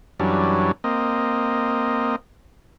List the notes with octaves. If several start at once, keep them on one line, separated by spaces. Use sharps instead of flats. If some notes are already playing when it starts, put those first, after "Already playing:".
F#2 E3 F#3 G3 C#4 D4
A#3 C4 D#5